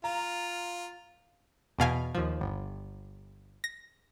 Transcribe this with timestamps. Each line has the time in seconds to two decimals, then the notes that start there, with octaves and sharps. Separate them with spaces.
0.04 F4 A#5
1.79 E2 B2 F5 G#5
2.15 D#2 F3
2.41 G1
3.64 A#6